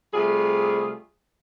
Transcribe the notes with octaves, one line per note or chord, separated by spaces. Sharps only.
C3 G3 A3 F4 G#4